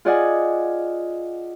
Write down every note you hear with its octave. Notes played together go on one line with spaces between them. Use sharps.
F4 G#4 D5 D#5 F#5 G#5